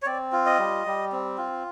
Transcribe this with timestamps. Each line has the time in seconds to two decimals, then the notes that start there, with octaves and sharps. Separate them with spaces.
0.02 C#5
0.06 C4 D5
0.32 F4
0.46 D#5
0.59 G3
0.86 G3
1.12 C4
1.38 F4